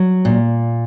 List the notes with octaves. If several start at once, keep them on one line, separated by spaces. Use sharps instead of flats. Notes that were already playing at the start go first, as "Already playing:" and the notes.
Already playing: F#3
A#2